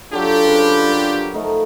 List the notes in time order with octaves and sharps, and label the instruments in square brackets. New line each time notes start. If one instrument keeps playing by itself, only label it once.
[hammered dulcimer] F#3 A4 [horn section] D4 F4 G4
[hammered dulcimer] C#3 B4 C5
A#4 C5
F3 A3 D#4